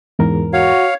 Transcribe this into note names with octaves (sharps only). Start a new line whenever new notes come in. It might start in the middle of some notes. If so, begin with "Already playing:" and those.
E2 G#2 A#4
F#4 C#5 F5